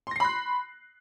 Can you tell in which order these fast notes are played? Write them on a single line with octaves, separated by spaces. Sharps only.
C6 A#6 C7 B5 F#6